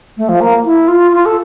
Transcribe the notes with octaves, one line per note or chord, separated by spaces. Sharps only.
A3
F3
A#3
E4
F4
F4
A4